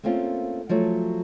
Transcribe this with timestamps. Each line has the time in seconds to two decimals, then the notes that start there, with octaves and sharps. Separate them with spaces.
0.03 A3 A#3 C4 C#4 F4
0.69 F3 F#3 A3 C#5